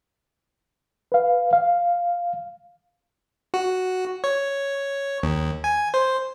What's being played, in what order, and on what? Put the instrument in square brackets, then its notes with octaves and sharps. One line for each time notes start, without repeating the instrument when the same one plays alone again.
[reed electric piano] B4 F5
F5
[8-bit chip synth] F#4
C#5
D#2
G#5
C5